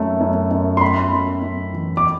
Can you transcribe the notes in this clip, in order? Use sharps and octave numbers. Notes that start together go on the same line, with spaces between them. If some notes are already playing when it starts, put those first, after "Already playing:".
Already playing: F#2 A3
F#2
F#2
C6
A3 B5
F#2
F#2
E3
D6